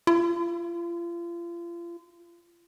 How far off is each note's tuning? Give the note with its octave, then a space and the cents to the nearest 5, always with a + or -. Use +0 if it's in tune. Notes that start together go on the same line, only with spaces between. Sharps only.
F4 -35